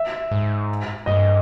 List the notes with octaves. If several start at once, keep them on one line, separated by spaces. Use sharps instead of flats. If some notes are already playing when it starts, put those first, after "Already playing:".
Already playing: E5
G#2
G2 D#5